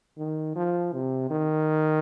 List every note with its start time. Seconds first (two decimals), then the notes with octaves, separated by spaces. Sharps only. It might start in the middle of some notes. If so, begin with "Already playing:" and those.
0.18 D#3
0.56 F3
0.93 C3
1.30 D#3